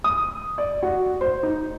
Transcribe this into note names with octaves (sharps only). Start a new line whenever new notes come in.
D#6
D5
F#4
C5
D#4